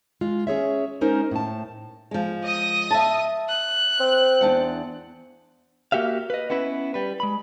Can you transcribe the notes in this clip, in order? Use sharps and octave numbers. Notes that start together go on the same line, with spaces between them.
G#3 F4
C#4 G#4 C#5 E5
G#3 C#4 D#4 A#4 C5
A2 A5
F3 G#3
D#5 D#6
E5 A5
F#6
C4
E2 D4 F#5
A#3 F#4 G4 E5 F5
B4 D#5
B3 C#4 E4 B4
G3 B4
G#3 B5